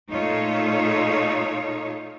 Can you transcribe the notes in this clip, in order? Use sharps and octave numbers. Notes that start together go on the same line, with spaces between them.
A#2 A3 D#4 F4 A4 C#5